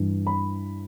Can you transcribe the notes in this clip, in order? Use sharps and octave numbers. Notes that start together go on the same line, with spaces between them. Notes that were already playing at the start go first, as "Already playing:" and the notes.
Already playing: G2 E3
B5